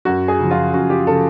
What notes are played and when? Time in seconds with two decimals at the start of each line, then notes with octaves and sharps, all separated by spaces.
0.05 F#2 F#4
0.28 G#4
0.39 C#3 F3
0.51 F4
0.74 F#2 F#4
0.90 G4
1.07 C#3 F3 A4